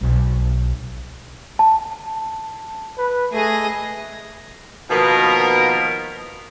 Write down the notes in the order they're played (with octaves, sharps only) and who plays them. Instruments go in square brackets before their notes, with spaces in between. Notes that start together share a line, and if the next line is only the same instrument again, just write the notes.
[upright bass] B1
[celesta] A5
[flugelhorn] B4
[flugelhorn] A3 [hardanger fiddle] G#4 D#5
[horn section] B2 D#3 F3 A#3 B3 A#4